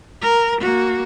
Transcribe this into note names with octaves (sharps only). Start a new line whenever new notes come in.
A#4
A#3 F#4